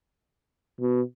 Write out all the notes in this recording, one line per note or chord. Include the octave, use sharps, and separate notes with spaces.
B2